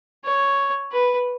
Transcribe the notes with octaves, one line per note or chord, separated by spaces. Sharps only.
C#5
B4